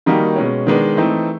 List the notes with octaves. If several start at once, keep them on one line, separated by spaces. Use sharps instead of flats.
D#3 G3 A#3 D#4 F#4
B2 G#3 C#4
D#3 G#3 B3 D4
E3 A3 C4 D#4